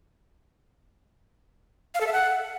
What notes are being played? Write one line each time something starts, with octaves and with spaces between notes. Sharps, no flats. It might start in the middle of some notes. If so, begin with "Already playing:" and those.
F5
A4
E5
F#5